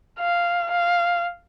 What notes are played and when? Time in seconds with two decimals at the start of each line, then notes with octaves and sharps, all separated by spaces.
0.19 F5
0.72 F5